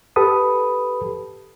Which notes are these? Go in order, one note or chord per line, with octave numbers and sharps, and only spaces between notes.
G4 A4 B4 B5 D#6